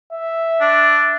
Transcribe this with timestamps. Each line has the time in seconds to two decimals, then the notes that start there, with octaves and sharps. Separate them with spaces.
0.13 E5
0.61 D4